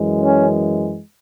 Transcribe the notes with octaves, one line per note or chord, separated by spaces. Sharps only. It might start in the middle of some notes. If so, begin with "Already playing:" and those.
Already playing: F#2 E3 G#3
C#4